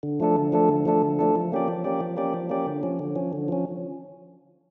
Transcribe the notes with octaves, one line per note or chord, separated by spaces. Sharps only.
D3
F3 A3 D4 A4
D3
F3 A3 D4 A4
D3
F3 A3 D4 A4
D3
F3 A3 D4 A4
F3
A#3 C#4 G4 D5
F3
A#3 C#4 G4 D5
F3
A#3 C#4 G4 D5
F3
A#3 C#4 G4 D5
D3
F3 C#4
D3
F3 C#4
D3
F3 C#4